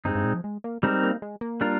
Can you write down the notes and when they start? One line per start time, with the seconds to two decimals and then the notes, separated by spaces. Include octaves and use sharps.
0.05 G2 G#3 C4 D#4
0.15 G2
0.24 A#2
0.34 F3
0.44 G#3
0.64 A#3
0.83 G3 G#3 C4 D#4 A#4
1.03 A#3
1.22 G#3
1.41 A#3
1.61 G3 D4 F4 A#4